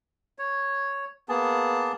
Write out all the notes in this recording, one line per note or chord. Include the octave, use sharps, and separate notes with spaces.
C#5
A#3 B3 G#4 A5